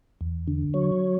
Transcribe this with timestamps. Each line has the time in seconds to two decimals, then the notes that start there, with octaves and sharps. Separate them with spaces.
0.21 E2
0.47 D3
0.74 F#3 C#5